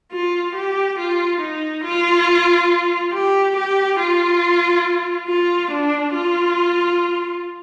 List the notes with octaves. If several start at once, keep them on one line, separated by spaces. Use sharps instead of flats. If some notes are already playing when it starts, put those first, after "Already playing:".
F4
G4
F4
D#4
F4
G4
G4
F4
F4
D4
F4